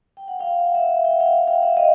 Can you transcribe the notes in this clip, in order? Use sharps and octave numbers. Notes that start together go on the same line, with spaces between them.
G5
F#5
F5 G5
E5 F#5
G5
F5 G5
F5 G5
E5 F#5
D#5 F5